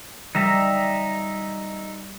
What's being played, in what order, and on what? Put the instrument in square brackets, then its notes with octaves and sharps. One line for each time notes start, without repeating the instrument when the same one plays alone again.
[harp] G3 [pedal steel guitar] D#4 E5 A#5